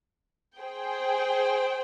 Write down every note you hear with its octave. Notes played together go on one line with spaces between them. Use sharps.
G#4 C5 G5